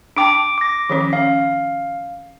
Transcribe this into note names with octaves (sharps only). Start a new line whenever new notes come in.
D4 G5 A5 D6 D7
D6 A#6
D#3 F3 C#4
C#4 F5